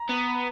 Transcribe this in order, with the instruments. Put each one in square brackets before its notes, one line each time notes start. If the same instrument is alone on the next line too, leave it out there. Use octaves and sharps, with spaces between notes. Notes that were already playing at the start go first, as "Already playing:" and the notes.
Already playing: [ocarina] A#5
[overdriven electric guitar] B3